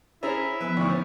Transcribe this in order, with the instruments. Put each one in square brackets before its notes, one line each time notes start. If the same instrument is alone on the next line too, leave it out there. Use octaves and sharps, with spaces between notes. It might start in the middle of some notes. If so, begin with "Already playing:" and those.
[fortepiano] C#4 G#4 A#5 [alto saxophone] E4 [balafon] C5
[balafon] F3 B3 [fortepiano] B4
[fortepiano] D2 A2 [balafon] D#4 D5 C#6
[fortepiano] C#4 [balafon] C5